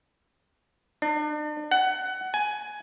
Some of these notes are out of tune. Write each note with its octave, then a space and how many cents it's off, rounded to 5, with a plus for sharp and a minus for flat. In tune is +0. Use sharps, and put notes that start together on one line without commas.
D4 +40
F#5 +20
G#5 +15